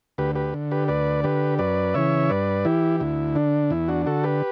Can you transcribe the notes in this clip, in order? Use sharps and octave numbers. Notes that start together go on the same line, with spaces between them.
D2 G4 B4
G4 B4
D3
G4 B4
D2 B4 D5
D3 G4 B4
F#2 B4 D5
C#3 E3 C#5 E5
G2 B4 D5
E3 E4 G4
D2 E4
D3 D4
E2 E4
D4 F#4
D3 F#4 A4
G4 B4